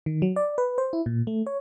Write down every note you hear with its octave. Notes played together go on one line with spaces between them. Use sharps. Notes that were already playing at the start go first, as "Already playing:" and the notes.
D#3
F#3
D5
B4
C5
E4
A#2
A3
C#5